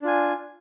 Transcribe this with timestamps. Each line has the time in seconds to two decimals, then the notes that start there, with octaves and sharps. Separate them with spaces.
0.02 D4
0.05 F4
0.07 G#5